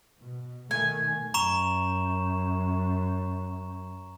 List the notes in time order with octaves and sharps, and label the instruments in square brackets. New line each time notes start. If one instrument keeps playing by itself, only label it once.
[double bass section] B2
[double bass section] B2 D#3 A3 [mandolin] G#5
[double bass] F#2 [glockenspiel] A#5 C#6 E7